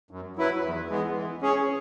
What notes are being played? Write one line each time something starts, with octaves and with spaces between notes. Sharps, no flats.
F#2
F#3 E4 B4
E2
E3 G#3 B3
E3
C#4 G#4 C#5